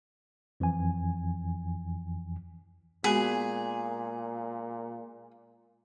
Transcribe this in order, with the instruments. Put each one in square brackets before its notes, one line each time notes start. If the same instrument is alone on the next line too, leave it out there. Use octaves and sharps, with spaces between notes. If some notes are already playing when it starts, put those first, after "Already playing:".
[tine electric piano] F2 E3 F3 G#5
[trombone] A#2 [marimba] G#3 B3 F#4 [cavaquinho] G#4